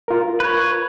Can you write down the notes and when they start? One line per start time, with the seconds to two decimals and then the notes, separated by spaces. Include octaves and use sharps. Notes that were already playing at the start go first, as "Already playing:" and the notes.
0.08 F4 A#4
0.40 B4 C#5